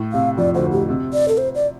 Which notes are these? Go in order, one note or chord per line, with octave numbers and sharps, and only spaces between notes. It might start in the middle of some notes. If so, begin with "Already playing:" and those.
Already playing: A2
C3 F5
F2 F3 D5
D2 D3 C5
A2 G4
C3
D5
A4
C5
D5